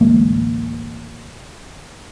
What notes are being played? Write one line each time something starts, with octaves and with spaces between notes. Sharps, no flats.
D1 A1 G#3 A#3